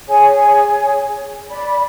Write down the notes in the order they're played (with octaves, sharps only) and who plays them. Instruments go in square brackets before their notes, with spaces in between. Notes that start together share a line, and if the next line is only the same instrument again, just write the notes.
[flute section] G#4 C#5 G#5
D5 B5